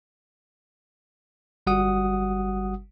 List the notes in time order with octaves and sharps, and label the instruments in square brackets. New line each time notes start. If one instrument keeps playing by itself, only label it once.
[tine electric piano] G1 G3 F#4 F#5 D#6